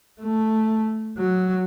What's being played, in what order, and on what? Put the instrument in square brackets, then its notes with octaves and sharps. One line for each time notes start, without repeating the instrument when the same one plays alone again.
[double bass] A3
F#3